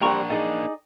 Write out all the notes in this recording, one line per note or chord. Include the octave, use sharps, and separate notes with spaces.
G3 A#3 C4 D4 F#5 G5 A#5 C#6
D#4 G#4 D5